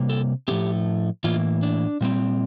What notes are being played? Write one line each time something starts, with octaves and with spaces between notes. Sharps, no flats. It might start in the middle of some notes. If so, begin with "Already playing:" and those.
Already playing: C3 G3 A#3
A4
A2 F3 A3 C4 G4
A2 E3 A#3 F4
D4
A#2 G3 C4